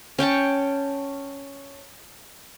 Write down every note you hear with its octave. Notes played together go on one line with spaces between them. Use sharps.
C#4 G5 A5 C#6